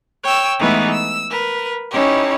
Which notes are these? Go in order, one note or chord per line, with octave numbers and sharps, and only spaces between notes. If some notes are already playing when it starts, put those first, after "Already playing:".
C#5 G5 E6
E3 G#3 A3 B3 D#4 E4
E6
A#4 B4
C#4 D#4 E4 G4 C#5